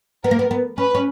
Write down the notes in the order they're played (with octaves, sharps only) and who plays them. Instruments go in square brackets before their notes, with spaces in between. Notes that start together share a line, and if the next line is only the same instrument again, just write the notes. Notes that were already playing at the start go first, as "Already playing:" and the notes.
[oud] B3 [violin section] A#4
[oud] A#3
B3
B3
[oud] C#4 [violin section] B4
[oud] C#4